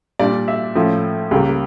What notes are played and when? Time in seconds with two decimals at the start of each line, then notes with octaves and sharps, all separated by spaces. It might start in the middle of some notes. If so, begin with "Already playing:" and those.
0.19 A#2 G3 D4 D5
0.48 E5
0.76 A2 F3 C#4
1.31 C#2 C#3 G3 A#3 C#4